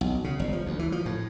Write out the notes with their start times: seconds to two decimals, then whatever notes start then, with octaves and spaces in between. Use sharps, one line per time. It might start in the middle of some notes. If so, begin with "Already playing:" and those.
0.01 B1
0.24 C#3
0.39 G1
0.53 F3
0.66 D2
0.79 E3
0.92 F3
1.06 A2